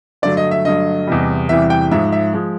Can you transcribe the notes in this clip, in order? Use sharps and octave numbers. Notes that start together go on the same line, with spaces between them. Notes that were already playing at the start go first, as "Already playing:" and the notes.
G2 D3 F#3 A3 D5
D#5
E5
G2 D3 F#3 A3 D#5
E2 C3 E3 G3
E2 C3 E3 G3 E5
G5
G#2 F3 G#3 E5
E5
F3 G#3